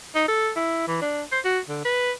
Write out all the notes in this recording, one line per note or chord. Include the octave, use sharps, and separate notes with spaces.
D#4
A4
E4
E3
D4
C5
F#4
D3
B4